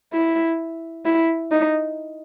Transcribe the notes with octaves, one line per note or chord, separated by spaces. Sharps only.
E4
E4
D#4